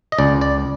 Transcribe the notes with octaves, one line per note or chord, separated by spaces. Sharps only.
D#5
C#2 D5
D5